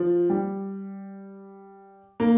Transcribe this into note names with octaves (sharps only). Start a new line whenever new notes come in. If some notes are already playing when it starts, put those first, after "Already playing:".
Already playing: F3
G3
A#3